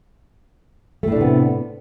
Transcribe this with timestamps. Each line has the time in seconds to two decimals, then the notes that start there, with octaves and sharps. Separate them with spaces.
1.03 A3
1.08 A2
1.12 D4
1.16 C3
1.21 B3